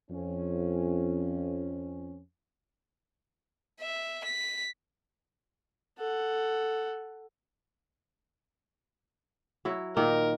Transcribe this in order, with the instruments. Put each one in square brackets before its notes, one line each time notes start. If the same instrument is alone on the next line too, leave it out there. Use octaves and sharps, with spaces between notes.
[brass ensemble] F2 C#4
[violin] E5
B6
[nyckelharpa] A4 F#5
[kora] F#3 E4
[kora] A#2 D#3 [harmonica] A#4